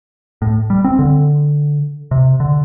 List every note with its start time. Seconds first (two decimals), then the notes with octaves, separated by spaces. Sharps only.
0.42 A2
0.70 G3
0.84 C4
0.99 D3
2.11 C3
2.40 D3